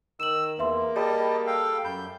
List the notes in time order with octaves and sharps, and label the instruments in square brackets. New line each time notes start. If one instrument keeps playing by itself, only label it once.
[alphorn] D#3 [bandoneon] E6 [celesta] E7 F#7
[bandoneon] E2 [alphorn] A#3 [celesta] B4 E5 C6
[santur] G3 [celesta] G#4 [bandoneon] D#5 A5
[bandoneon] A4 F5 G5
[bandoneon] F#2 G6 [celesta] B5